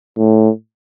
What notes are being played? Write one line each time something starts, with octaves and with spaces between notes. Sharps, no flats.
A2